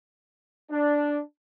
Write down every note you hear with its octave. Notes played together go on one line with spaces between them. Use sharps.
D4